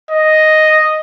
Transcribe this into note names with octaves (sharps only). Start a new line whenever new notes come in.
D#5